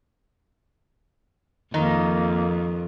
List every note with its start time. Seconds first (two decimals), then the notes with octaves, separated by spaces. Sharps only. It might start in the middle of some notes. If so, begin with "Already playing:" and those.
1.74 F2 D#3 A#3 D#4